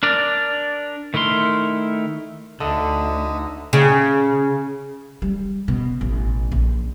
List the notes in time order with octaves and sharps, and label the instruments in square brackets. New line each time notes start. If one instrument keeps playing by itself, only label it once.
[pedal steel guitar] D4 A#4 D5
D#3 A3 E4 A#4 C6
[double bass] D2 [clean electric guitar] D3 [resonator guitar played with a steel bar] A3 [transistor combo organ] D#4 D#5 E5
[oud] C#3
[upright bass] G3
B2
A1
A#1